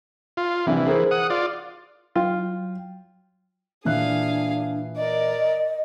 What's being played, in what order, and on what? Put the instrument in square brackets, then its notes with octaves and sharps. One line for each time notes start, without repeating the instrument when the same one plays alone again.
[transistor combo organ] F4
[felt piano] A#1 C3 [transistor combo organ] E3
[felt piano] G#4 A#4 C5
[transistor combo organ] F#5 D#6
F4 D5
[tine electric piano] F#3 G5 [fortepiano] F4
[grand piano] A#2 E3 F#6 [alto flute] D4 [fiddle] G#4 F5
[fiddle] A#4 D5 [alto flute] D#5